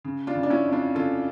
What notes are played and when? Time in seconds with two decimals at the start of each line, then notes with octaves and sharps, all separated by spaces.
0.05 C#3
0.27 D4 F4
0.35 C#3
0.43 D4
0.50 C#4 E4
0.65 F2
0.72 D4 F4
0.95 C#3 F4 A4